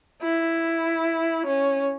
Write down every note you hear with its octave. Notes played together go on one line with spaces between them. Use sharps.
E4
C#4